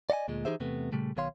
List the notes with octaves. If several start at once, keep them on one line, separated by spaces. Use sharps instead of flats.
D5 D#5 F#5 G#5
D2 A#2 G#3
E3 D#4 G4 G#4 C5 E5
E2 C3 A3 B3
A#2 C#3 G3 A3
B1 B2 D#3 C#5 F5 C6